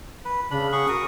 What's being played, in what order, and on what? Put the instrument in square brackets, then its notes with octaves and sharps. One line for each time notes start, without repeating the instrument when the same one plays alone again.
[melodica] B4
[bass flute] C#3 [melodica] D4 B5
[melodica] G#4 F#5 C#6
[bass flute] F#4 [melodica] A#4 C#6 D#6